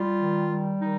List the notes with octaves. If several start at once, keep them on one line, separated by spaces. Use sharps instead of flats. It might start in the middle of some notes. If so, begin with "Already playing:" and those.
Already playing: G3 F4
D#3
G3
D#3 D#4